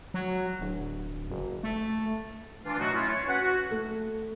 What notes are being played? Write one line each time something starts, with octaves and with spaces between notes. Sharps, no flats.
F#3
D1
F#1
A3
E3 D4 F4
B2 F#3 A3 D#4 F#4
A3 C#4 E4 F4
C#5 C#6
C#4 F#4 B4 F#5
F#4
A3